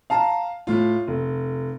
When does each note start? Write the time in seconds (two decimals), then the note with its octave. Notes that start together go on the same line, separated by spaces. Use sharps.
0.10 F5 A5 A#5
0.67 A2 F4
1.07 F1